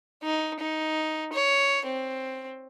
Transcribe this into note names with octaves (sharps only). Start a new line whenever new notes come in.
D#4
D#4
C#5
C4